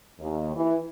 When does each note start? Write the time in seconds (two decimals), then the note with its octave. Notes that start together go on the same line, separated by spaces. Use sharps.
0.20 D#2
0.56 E3